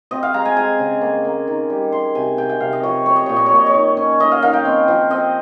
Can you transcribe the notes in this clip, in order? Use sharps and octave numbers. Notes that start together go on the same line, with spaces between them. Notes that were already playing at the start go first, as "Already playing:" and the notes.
C4 D#5
F5
G#3 A#5
G#5
G#3 G#5
C#3
A#3
A#3
D#3
G3
G#3 C6
C3 G#5
C3 G5
G5
C3 F5
D#5
F3 C#5
C4 C#5
D#5
A#2 C#5
D#5
C#5
A#2 D#5
C#5
D#3
C#4
D#3 D#5
F5
D#3 F5
G5
C4
F3
C4 D#5